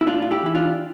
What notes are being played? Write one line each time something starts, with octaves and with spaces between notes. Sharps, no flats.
E4
A2 D4 F4
F4
E4 G4
E3 E4
D4 F4